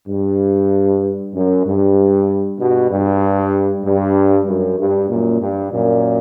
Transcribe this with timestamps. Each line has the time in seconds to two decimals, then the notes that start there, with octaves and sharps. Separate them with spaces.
0.08 G2
1.34 F#2
1.66 G2
2.59 G2 B2
2.90 G2
3.85 G2
4.47 F#2
4.77 G2
5.09 F#2 A#2
5.40 G2
5.72 F#2 A#2